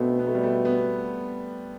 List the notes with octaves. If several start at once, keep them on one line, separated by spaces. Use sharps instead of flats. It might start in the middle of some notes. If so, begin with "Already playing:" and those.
Already playing: B2 A3 B3 C4 D4
B3
A3
G3
A3
B3